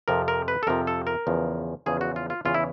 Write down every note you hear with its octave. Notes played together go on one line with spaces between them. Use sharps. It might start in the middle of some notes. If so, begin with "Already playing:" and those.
F2 C3 F3 A#4
A#4
B4
A4
F2 C3 F3 A#4
A4
A#4
E2 C#3 F3
E2 C#3 F3 G#4
F#4
F4
F4
E2 C#3 E3 F4
E4